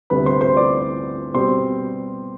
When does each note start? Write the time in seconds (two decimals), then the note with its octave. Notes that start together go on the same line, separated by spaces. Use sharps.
0.10 D2 C3 G3 B3 B4 B5
0.25 C5 C6
0.41 C5 C6
0.56 D5 D6
1.34 B2 G3 C4 C5 C6